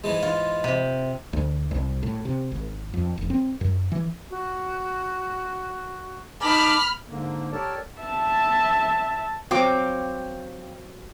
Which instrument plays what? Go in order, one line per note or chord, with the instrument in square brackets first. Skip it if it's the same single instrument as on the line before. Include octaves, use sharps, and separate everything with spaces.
[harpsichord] G#2 E3 G#3
[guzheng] F4
C3
[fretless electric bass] D2
C2
A2
C3
G#1
F2
F1
C4
F#2
E3
[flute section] F#4
[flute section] D#4 A5 D6 [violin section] B5 F6
[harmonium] G#2 D3 A#3
G4 A4 A#4 C#5 D5 A5
[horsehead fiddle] E5 A5
[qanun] F#3 C4 F#4 [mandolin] F5 G5 D6